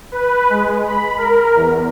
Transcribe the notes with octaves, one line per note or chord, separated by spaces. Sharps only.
B4
G#3
B5
A#4
E2